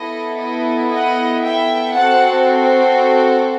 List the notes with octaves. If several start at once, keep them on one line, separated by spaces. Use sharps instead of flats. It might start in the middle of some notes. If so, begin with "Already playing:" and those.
Already playing: B3 E4 A4 D#5
D#5
D#5 F#5
E5 G5
C4 F#4 A4 F#5 A5